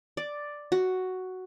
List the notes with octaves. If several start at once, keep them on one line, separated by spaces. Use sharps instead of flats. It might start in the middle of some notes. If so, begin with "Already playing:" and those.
D5
F#4